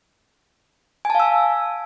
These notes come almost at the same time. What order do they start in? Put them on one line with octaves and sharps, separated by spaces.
G#5 A5 F5 E6